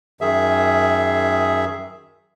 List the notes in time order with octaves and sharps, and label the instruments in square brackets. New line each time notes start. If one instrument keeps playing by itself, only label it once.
[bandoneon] F#2 D#3 G#4 E5